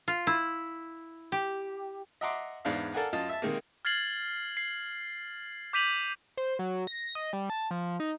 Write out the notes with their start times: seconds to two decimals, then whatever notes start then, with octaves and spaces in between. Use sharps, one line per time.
0.08 F4
0.27 E4
1.32 G4
2.21 D#5 E5 F#5 A#5 C6 D6
2.65 E2 G#2 B3 D4 F5 F6
2.94 A4 A#4 D5 F5 F#5 G#5
3.13 F#2 F4 D#5 A5
3.29 E5 A5
3.42 C3 D#3 G#3 A#3
3.85 F6 G#6 A6 C7 F#7
4.57 C7
5.73 D6 G6 B6 D#7 F7 F#7
6.37 C5
6.59 F#3
6.87 A#6
7.15 D#5
7.33 G3
7.50 A5
7.71 F3
8.00 D#4